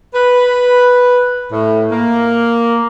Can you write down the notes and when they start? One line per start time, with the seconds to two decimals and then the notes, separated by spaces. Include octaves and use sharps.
0.15 B4
1.52 A2
1.91 A#3